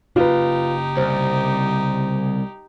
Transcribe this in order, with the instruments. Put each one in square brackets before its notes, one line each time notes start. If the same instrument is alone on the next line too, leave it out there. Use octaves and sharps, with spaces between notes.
[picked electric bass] C#3 A#3 [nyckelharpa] D#4 G4 [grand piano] F4 B4
[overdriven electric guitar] C2 [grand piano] C5